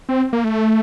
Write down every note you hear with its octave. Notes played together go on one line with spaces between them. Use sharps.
C4
A#3
A3